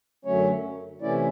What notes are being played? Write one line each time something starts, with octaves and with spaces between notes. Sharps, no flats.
F#2 D3 F#3 A3 C#4 C#5
C3 E3 A3 C#4 E4 D5